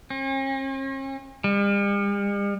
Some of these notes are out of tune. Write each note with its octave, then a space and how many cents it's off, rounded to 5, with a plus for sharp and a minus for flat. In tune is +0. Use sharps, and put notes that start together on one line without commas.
C#4 -45
G3 +45